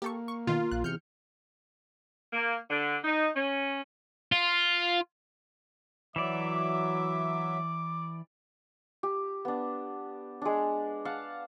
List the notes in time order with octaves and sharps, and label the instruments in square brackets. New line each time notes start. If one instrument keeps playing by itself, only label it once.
[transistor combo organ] A#3 [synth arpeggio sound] G4 A4 C#6
[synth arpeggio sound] C#6
[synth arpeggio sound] B2 D#3 [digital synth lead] F4
[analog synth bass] A#1 [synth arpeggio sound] F#6
[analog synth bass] E2 [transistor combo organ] C3 F6 [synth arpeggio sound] G6 C#7
[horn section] A#3
D3
D#4
C#4
[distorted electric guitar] F4
[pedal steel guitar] E3 D5 [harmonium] F#3 E5 [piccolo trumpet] D6
[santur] G4
B3 D4
G#3 D4
F5 F#5 A5